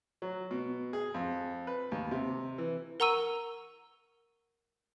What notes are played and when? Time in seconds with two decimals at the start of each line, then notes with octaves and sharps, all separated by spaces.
0.22 F#3
0.51 B2
0.93 G#4
1.14 F2
1.67 B4
1.92 D#2
2.11 C3
2.58 E3
3.00 A#4 F#5 A#5 C#6 E6 D#7